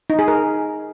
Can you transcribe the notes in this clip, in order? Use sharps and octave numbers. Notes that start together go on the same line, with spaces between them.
D#4
G#4
A#4